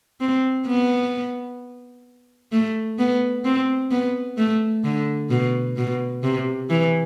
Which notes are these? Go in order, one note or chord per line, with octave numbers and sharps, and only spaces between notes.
C4
B3
A3
B3
C4
B3
A3
D3
B2
B2
C3
E3